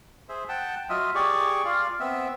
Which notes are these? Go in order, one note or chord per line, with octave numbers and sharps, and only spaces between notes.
G#4 C5 E5
F#5 G5 A5
F#3 F4 D#5 E5
G4 G#4 D5 C#6
F4 D5 F5
B3 C4 E5